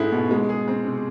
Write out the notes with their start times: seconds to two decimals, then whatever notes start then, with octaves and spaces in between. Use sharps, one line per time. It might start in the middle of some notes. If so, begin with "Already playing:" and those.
Already playing: G#2 A3 E4 G#4
0.12 B2
0.31 G#3
0.49 G#4
0.68 C4
0.85 C3